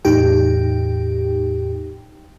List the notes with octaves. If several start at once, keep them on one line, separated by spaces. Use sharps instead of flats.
E2 A2 D#4 G4 G5